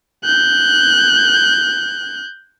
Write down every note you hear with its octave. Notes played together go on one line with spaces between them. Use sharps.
F#6 G6